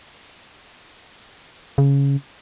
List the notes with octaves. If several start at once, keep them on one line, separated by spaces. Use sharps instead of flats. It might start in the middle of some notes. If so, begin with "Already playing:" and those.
C#3